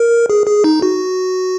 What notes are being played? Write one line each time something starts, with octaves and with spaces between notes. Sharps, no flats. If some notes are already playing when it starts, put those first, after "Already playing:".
Already playing: A#4
G#4
G#4
D#4
F#4